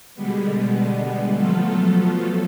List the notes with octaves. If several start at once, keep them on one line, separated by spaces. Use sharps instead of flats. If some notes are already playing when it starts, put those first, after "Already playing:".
B2 D3 G3 G#3 B3
F3 F#3 A3 B3 F4 A4